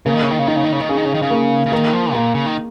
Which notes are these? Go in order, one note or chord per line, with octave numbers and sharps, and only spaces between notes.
C#3 A#3
D#3
C#3
D#3
C#3
D#3 D#4
C#3
D#3
C#3
D#3
C#3 G#4
D#3
C#3
D#3
C#3
A#3
C#3
D#3 A#3
F3
A#2 A#3
C#3
D#3